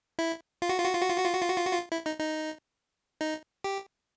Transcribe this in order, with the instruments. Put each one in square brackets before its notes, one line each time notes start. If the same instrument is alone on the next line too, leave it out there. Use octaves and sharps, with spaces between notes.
[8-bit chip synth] E4
F4
F#4
F4
F#4
F4
F#4
F4
F#4
F4
F#4
F4
F#4
F4
F#4
F4
E4
D#4
D#4
D#4
G4